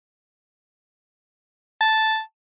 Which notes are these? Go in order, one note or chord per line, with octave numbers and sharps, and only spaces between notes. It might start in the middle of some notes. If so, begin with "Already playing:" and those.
A5